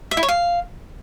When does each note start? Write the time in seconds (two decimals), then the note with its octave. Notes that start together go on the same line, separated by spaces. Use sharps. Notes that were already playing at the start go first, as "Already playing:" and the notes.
0.11 E5
0.17 E4
0.23 C#5
0.28 F5